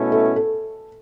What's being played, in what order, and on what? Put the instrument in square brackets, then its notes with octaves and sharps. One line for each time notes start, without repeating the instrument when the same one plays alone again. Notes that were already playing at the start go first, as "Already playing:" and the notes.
Already playing: [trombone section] B2 A3 C#4 E4
[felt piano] A4
A4